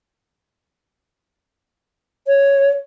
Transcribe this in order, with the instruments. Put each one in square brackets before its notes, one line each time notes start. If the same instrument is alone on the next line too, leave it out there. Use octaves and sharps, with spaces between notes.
[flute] C#5